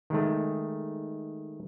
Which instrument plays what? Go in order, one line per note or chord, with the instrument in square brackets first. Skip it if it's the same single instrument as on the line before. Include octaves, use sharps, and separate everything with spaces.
[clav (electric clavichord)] D#3 G#3 A3